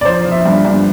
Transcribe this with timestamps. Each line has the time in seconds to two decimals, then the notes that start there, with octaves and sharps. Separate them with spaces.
0.01 D5
0.05 F3 C5
0.25 F3
0.31 E5
0.45 G2
0.65 G2